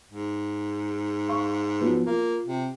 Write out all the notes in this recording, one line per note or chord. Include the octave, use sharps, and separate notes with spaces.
G#2
F5 C6 C#6
F3 F#3 B3
A#3 F4
C3